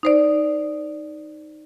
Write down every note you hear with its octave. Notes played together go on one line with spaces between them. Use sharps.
D#4 C5 D5